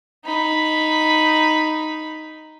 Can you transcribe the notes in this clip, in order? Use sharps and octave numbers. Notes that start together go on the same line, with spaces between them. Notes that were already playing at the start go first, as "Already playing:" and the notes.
D#4 B5